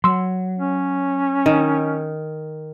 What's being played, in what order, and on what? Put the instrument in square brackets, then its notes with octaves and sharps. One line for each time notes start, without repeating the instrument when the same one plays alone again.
[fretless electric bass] F#3 [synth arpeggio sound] C6 E6
[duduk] C#4
[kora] D#3